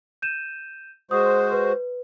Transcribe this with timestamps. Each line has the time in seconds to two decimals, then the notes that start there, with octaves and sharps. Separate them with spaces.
0.22 G6 D#7 E7
1.11 G#3 F#4 C5 D#6
1.52 B4